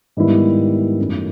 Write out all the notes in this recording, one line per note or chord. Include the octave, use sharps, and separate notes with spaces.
G#2 D#3 G3 B3 E4
F#2 D#3 F#3 A3 C#4